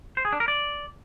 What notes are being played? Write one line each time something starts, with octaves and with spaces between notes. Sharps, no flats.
C5
G#4
D4
A#4
D5